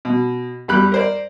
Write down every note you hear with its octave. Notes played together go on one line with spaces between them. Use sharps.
B2
E2 G3 B5 F#6
A#4 C5 D5